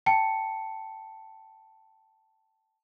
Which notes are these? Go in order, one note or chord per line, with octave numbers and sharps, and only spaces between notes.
G5 A5 C#7